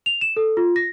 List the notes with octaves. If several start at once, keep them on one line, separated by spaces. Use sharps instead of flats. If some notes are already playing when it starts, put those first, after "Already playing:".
F7
E7
A4
F4
A#6